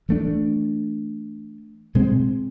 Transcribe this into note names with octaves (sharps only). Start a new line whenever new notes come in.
E3 A3 D4
B2 G#3 C4